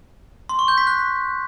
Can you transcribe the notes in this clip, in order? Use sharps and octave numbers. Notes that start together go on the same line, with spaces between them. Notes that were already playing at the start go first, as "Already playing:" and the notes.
C6
C#6
G6
B6
F#6